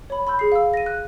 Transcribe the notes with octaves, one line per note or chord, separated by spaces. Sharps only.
C#5 B5
B5 C6 E6 G6
G#4 C7
F5 E6
A#6 D#7
F#6